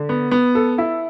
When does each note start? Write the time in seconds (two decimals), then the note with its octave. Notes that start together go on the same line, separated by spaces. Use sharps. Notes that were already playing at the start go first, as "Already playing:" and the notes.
Already playing: D3
0.09 B3
0.31 B3
0.55 A4
0.78 E4